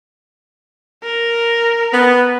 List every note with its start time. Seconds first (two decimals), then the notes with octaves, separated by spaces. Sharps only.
1.03 A#4
1.94 B3